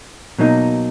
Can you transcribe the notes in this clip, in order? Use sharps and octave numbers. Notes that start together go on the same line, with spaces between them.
B2 F#3 A#3 D#4